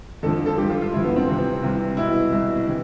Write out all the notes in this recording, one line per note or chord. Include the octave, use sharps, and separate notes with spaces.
F2 D3 F3 A4
A4
G2 F3 G4
F4
F4
G2 F3 E4
B3
C4
C2 C3 E3
C2 C3 E3
C2 B2 E4
C2 B2
C3 E3